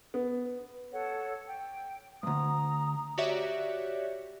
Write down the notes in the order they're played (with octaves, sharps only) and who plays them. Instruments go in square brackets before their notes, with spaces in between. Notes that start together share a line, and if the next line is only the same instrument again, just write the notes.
[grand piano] B3
[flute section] A4 C#5 F#5
G5
[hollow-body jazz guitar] D2 G2 [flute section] A#5 D#6
[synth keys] F#4 G4 C#5 D5 E5